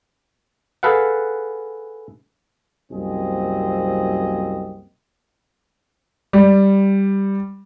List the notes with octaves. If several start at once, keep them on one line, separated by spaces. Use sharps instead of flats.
G#4 A4 B4 F5 F#5
C2 F#2 A#3 C4 G#4 D#5
G3